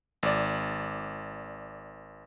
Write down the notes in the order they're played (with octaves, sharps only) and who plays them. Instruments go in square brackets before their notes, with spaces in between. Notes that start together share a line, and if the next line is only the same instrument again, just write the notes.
[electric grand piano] G#1 D5